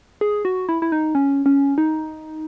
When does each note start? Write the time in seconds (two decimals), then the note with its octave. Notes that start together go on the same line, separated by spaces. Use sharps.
0.21 G#4
0.45 F#4
0.69 E4
0.82 E4
0.92 D#4
1.15 C#4
1.46 C#4
1.78 D#4